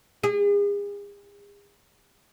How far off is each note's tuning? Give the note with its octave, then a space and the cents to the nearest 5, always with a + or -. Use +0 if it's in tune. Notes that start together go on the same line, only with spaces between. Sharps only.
G#4 -40